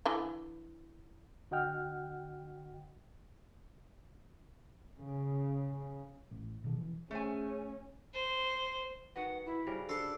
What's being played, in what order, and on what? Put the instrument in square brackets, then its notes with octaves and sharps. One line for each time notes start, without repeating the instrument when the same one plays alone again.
[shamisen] D3 E3
[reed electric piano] D3 F#4 D#5 F#5 G5 F6
[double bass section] C#3
[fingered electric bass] A1
B2 D#3
E3
[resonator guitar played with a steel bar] A3 C5 G#5 [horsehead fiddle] C#4 [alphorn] G#4
[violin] C5
[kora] D#3 F#4 D#5 [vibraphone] B4 [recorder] F#5
[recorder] E4
[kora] C#3 G3 A#4 [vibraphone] F#4 C5
[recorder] D4 [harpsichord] A4 C6